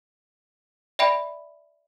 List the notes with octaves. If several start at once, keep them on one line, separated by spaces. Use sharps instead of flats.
D5 E5 G5 B5 D7